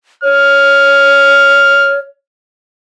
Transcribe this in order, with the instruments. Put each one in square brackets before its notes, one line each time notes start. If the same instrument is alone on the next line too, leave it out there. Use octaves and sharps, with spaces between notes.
[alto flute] C#5 [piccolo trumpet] F6